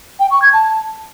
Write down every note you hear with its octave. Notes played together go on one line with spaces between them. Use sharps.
G5
C#6
G#6
A5